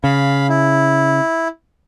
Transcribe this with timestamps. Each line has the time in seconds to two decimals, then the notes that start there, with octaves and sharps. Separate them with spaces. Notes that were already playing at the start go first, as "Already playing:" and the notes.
0.04 C#3 F5 B5
0.49 E4